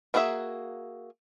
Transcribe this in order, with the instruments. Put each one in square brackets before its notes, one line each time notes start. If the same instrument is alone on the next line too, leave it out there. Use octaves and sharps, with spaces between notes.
[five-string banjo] A#3 D4 F#4 G#4 E5